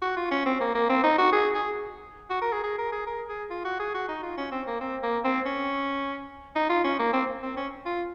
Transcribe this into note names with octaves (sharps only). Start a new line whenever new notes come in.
F#4
F4
C#4
C4
A#3
A#3
C4
D#4
F#4
G#4
G#4
F#4
A#4
G#4
G#4
A#4
G#4
A#4
G#4
F4
F#4
G#4
F#4
D#4
F4
C#4
C4
A#3
C4
A#3
C4
C#4
D#4
F4
C#4
A#3
C4
C4
C#4
F4